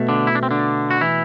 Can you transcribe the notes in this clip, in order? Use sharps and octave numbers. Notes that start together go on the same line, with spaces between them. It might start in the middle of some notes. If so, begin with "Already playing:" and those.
Already playing: B2 A3
D3 D4
E4
D4
C4
D3 D4
F#4
E3 E4